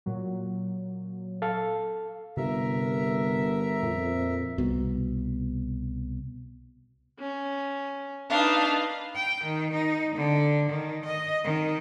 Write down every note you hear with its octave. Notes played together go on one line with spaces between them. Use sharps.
A#2 F#3
A4 F5
G1 C3 A#4 E5
F2 A#2
C2 B2
C#4
D4 D#4 B4 F5
G5
D#3
D#4
D3
D#3
D#5
D#3